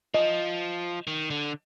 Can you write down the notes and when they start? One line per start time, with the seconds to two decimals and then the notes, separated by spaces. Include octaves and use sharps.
0.14 F3 D#5
1.07 D#3
1.30 D3